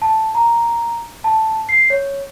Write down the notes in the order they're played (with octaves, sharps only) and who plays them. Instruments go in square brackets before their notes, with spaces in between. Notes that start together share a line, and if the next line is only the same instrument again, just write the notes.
[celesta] A5
A#5
A5
C7
C#5